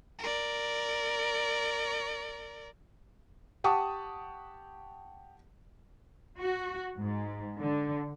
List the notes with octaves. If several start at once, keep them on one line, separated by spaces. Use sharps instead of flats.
A#4 D5
G4 F#5 A5 C#6 D#6
F#4
G#2
D3